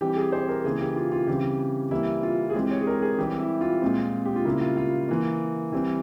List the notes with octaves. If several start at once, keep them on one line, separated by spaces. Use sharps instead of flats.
E3 G3 C4 G4
G#4
C5
A#4
C#3 E3 A#3 G#4
G4
F4
F4
C#3 E3 G3 C4 G4
E3 G3 A#3 E4
F4
G#4
E3 G#3 C4 G4
C#5
G#4
A#4
G#4
E3 G3 C4 G4
E4
F4
A#2 G#3 C4
G4
F4
C#3 G3 A#3 E4
F4
F4
E3 A#3
E3 G3 C4